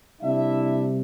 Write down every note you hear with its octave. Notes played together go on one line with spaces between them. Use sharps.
C3 G3 D4 E4 E5